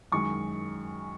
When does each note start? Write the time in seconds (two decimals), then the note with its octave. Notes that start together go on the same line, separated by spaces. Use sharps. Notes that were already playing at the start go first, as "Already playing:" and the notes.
0.12 F#2 D#3 G#3 C#6